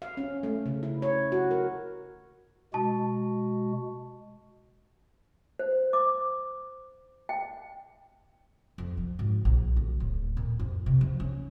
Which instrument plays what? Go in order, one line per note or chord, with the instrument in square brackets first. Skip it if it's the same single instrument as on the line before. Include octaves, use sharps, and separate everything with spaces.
[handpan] F5
C#4
A3
C#3
E4
C#5
F#4
A#4
[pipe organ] B2 G#3 F#4 [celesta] A5
[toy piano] C5
D6
G5
[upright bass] F2
F3
G#1
A#1
D2
D1
A#2
F2
C3
F3
C#4